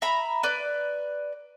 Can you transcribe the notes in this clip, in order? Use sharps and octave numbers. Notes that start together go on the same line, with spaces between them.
E5 A#5 B5
B4 D5